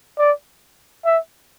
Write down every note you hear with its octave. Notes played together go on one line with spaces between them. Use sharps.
D5
E5